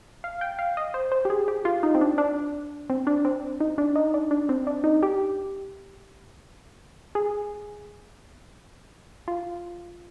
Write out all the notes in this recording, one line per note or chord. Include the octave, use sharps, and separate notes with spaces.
F5
G5
F5
D#5
C5
C5
G4
G#4
G4
F4
D#4
C4
D4
D4
C4
D4
C4
D#4
D4
D#4
D4
D4
C4
D4
D#4
G4
G#4
F4